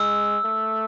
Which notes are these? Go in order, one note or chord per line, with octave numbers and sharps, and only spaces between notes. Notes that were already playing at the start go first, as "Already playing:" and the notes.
Already playing: G#3 E6
A3